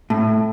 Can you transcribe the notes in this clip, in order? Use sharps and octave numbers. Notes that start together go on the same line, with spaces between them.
A2